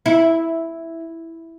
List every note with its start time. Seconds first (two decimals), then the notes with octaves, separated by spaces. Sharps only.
0.06 E4